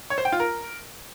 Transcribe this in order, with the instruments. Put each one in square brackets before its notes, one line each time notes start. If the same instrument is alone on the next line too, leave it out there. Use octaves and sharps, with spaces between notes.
[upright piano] C#5
C5
G5
F4
A#4